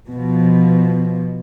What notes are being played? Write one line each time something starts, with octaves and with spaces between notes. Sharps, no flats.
B2 F3